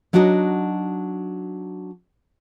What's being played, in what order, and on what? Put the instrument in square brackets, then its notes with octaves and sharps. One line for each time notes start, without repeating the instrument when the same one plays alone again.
[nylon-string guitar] F#3 D4 D#4 F#4 B4 D#5